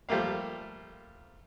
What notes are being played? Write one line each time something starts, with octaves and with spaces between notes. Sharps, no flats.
F3 G3 A3 A#3 F5